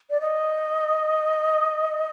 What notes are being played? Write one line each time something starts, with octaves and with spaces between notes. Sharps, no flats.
D5
D#5